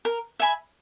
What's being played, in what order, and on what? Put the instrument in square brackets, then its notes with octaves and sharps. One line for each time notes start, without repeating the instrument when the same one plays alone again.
[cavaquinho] A#4
E5 G#5 B5